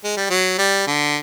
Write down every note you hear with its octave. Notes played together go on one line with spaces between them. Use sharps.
G#3
G3
F#3
G3
D3